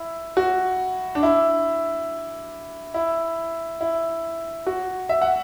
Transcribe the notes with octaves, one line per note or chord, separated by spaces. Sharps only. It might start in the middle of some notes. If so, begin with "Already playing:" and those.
Already playing: E4
F#4
D4
E4
E4
E4
F#4
E5
F#5